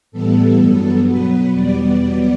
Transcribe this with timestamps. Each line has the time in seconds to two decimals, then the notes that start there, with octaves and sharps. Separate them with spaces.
0.12 A2 E3 G3 B3 A4
0.58 G2 F#3 B3
1.06 B2 F#3 B3 B4
1.52 E2 B2 G3 B3 D5
1.99 B2 F#3 B3